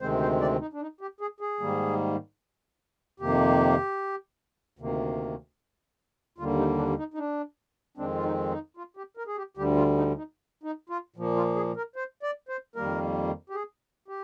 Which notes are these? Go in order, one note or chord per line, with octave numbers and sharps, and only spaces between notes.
D2 C3 D#3 G#3 C4 C5
C5
D5
D#4
D4
D#4
G4
G#4
G#4
G#2 D#3 G3 A#3
F2 C3 D#3 A#3 G4
D2 C3 D#3 A#3
D#2 D3 G3 A#3 F4
D#4
D4
D#4
D#4
D4
F2 D#3 G#3 C4 D4
F4
D#4
D#4
F4
G4
A#4
G#4
G4
D2 D3 G3 G4
F4
D#4
D#4
D#4
F4
A#2 F3 A#3
F4
G#4
A#4
C5
D5
C5
F2 D#3 G3 A#3 A#4
G4
G#4
G4